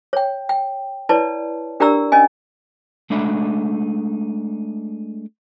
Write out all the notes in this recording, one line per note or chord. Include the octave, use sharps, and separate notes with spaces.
C#5 G5
G5
E4 B4 C#5 D5 A5
D4 G4 A#4 D5 A#5 E6
C#4 D#5 G#5
G#3 A3 D4 D#4 E5 B5